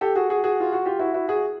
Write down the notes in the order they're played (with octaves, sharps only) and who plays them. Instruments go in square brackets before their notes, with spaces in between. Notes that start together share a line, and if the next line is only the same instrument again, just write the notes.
[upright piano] G4 A4
F#4 G#4
F#4 G#4
F#4 G#4
F4
F#4
F4 G4
E4 F#4
E4 F#4
F#4 G#4